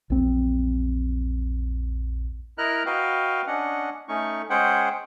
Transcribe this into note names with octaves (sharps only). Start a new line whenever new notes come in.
A#1 E2 C4
E4 A#4 D#5 A#5 F6 F#6
F#4 B4 D#5 F5 G5
C#4 D4 D#5 F#5
A3 C#4 D#4 C#6
G#3 C#4 G#4 C5 F#5 G5